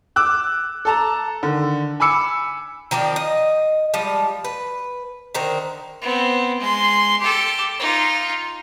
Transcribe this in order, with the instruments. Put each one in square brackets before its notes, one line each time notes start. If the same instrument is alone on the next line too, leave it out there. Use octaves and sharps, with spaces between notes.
[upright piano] D6 E6 F#6
A4 A5 A#5
D3 D#3
G#5 B5 D6 E6 C#7
[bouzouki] D#3 F3 C4 D5
D#5
F3 G3 G#3
B4
D3 D#3 A#4 C5
[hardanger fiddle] B3 C4
G#3 C6
G4 A4
D#4 F4